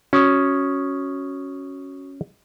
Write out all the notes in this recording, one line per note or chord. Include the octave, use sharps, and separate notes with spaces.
C#4 F#4 C#6 D#6